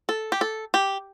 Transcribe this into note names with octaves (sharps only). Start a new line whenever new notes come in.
A4
G4
A4
G4